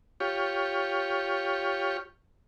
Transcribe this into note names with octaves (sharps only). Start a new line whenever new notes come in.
F4 G4 C#5